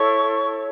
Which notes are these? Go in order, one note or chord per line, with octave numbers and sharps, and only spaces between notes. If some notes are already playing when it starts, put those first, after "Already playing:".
Already playing: E4 A4 C#5 C#6